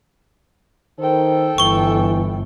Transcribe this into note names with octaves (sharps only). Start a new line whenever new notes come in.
D#3 A4 C5 G5
G1 E3 C#6 G7